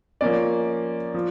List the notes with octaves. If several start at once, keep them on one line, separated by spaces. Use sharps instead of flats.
F3 A#3 C#4 D5
F3